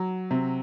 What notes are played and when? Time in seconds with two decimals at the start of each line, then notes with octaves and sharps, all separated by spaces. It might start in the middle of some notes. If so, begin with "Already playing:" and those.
Already playing: F#3
0.31 C3